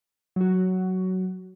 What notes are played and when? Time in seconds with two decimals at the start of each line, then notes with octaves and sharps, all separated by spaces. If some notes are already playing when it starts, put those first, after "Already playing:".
0.36 F#3 F#4